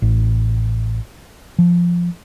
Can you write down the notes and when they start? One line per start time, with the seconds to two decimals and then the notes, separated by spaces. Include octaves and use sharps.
0.02 A1
1.59 F3